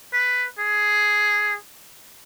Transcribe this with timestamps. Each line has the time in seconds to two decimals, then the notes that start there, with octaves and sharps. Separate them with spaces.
0.13 B4
0.59 G#4